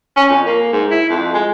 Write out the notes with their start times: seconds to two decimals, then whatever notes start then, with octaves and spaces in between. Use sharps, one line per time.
0.16 C#4
0.29 F2
0.46 A#3
0.73 G#2
0.91 E4
1.09 F2
1.34 G#3